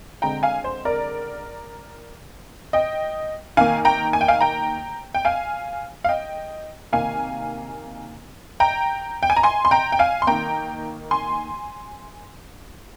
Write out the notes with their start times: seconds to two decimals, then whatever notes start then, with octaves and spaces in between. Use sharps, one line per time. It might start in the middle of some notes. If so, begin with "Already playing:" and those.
0.22 D3 G#3 C4 G5 A#5
0.43 F5 G#5
0.64 C5
0.85 A#4 D5
2.73 D#5 G5
3.57 D#3 A#3 F5 G#5
3.85 G5 A#5
4.13 G#5
4.21 G5
4.28 F5 G#5
4.41 G5 A#5
5.15 G5
5.25 F5 G#5
6.04 F5
6.09 D#5 G5
6.92 C3 D#3 A#3 F5 G#5
8.60 G5 A#5
9.23 G5
9.30 G#5
9.37 A#5
9.43 G#5 C6
9.65 C6
9.71 G5 A#5
9.92 G5
9.99 F5 G#5
10.22 C6
10.27 D#3 A#3 G5 A#5
11.11 G#5 C6